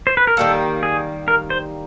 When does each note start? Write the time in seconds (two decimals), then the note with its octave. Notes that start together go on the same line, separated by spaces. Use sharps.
0.07 C5
0.17 B4
0.27 A#4
0.37 D#3 G3 A#3 A4
0.83 G#4
1.28 A#4
1.50 C5